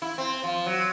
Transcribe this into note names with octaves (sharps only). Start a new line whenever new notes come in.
E4
C4
F3
F#3